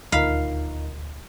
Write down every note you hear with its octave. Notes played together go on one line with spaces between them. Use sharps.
D#1 D2 D#4 F4 A#4 F5 B5